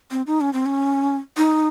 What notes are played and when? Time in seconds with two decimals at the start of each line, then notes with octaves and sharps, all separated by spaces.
0.11 C4
0.27 D#4
0.41 C#4
0.53 C4
0.66 C#4
1.37 D#4